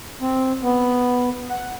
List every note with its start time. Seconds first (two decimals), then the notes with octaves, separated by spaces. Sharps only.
0.21 C4
0.63 B3
1.50 F#5